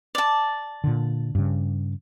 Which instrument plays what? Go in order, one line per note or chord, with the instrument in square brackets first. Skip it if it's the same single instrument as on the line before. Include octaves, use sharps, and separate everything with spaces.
[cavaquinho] D5 A5
[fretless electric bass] A#2 D3
G2 C#3